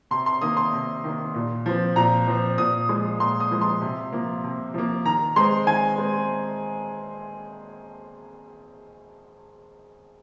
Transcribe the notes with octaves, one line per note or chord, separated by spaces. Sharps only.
C3 C6
C6
D#3 A#3 D#6
C6
C3
D#3 A#3
A#2
F3 C4
A#2 A#5
F3 C4
A#2 D#6
F3 G#3
A#2 C6
D#6
F3 G#3
C6
C3
F3 A#3
C3
F3 A#3
D#3 A#5
G#3 C4 C6
D#3 G#5
G#3 C4